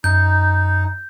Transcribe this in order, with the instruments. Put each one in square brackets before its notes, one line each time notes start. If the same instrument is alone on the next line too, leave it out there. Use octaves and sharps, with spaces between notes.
[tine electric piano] F#2 [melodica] D#4 [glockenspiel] G6